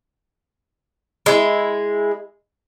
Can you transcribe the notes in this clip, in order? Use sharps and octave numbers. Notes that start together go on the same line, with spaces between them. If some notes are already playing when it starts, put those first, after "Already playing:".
G#3 E4